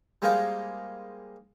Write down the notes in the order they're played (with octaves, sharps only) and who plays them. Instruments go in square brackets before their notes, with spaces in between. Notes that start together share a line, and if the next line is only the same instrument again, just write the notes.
[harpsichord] G3 G#3 A#3 D#4 F4 C5